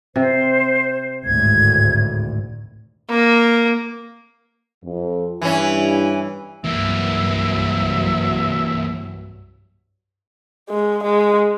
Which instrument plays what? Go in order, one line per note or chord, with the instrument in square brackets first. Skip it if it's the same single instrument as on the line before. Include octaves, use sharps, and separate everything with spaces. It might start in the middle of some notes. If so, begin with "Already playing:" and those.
[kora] C3 [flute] C5
[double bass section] G#1 D2 A2 [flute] G#6
[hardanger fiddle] A#3
[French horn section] F2
[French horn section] G2 E4 [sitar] E3 C#4
[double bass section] C2 G2 F#3 [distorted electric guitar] E3 A#3 [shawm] E5
[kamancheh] G#3
G#3